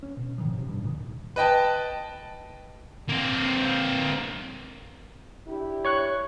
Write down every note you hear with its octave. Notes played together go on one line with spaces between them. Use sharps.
C#4
B2
G#2 D#3 F3
G#2 C3
G2
D#2 G#2 B2 D#3
B4 D#5 G5 A5
A#3 C4
D4 E4 G4
C#5 C#6 F#6